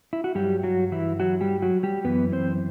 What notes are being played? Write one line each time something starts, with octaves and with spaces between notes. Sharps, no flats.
E4
F#4
G2 F#3 G3 G4
F#3 F#4
E3 E4
F#3 F#4
G3 G4
F#3 F#4
G3 G4
F#2 E3 B3 B4
C4 C5